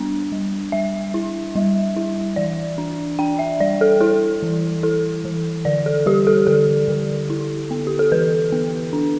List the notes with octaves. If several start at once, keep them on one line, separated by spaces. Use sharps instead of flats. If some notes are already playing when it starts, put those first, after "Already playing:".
Already playing: G3 B3 D4
G3
G3 E5
E4
G3
E4
E3 D5
D4
D4 G5
E5
G3 D5
A4
E4 A4
E3
E4 A4
E3
D3 D5
A4
G3 G4
A4
D3 A4
D3
E4
B3
G4
A4
E3 B4
B3
D4